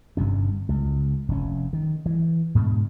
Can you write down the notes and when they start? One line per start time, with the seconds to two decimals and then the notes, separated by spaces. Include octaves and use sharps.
0.17 G1 G2 C3 C#4
0.69 C#2
1.29 F1 C#4
1.73 D#3
2.06 E3
2.55 G#2 B2 D3